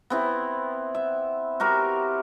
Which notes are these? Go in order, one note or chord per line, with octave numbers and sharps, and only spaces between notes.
B3 C4 E4
E5
F#4 G4 A#4 E5